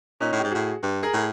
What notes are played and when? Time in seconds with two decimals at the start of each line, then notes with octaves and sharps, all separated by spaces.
0.20 A#2 C#4 D#4
0.33 A2
0.39 G#2 G4
0.51 A2 F#4 G#4
0.83 G2
1.03 G#4 A#4
1.13 A2 G#4